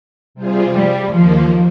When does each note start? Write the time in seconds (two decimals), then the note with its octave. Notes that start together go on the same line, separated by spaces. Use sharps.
0.35 C3 G3 C4 F4 G#4
0.74 G3
1.13 D#2 D#3 F3 A#3